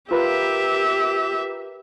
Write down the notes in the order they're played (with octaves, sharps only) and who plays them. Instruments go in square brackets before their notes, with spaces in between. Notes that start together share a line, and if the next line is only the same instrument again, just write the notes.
[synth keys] F4 A#4 B4 [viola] G4 E5